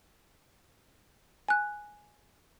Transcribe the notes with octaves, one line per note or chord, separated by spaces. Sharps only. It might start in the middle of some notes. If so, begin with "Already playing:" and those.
G#5 F#6